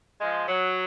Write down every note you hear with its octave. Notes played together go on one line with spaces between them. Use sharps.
F3 G#3
F#3